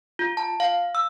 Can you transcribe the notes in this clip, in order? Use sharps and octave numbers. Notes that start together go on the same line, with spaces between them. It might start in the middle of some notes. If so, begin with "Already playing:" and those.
F4
A5
F5
E6